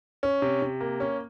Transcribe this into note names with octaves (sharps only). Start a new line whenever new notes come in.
C#4
C3
C3
A#3
C#4